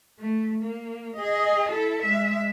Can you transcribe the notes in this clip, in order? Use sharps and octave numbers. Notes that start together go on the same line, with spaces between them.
A3
A#3
G#4 D#5
E4 A4
G#3 E5